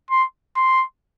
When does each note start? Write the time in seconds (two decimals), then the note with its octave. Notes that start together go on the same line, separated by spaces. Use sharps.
0.10 C6
0.56 C6